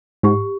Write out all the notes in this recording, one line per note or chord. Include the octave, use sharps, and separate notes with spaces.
G#2 G4